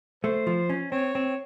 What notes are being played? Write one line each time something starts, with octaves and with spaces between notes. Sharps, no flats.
A3 C5
F3
C#4
C4 C#5
C4